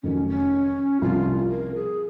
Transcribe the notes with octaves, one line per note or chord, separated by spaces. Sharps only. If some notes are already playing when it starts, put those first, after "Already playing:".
F1 F2 D#3 F#3 C#4
C#4
C2 C3 F3 F4
A#4
G#4